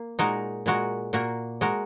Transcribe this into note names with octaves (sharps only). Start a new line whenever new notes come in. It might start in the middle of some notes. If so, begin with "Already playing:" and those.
Already playing: A#3
A#2 G#3 D#4 F#4 A#4
A#2 G#3 F#4 A#4
A#2 A#3 F#4 A#4
G#3 F#4 A#4